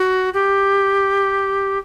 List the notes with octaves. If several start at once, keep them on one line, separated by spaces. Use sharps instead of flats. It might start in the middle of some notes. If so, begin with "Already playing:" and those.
Already playing: F#4
G4